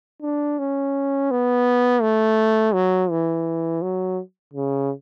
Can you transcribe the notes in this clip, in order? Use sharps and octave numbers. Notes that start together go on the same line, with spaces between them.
D4
C#4
B3
A3
F#3
E3
F#3
C#3